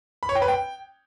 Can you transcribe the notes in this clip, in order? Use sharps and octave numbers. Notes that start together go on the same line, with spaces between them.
B5
C#5
G5
B4
G5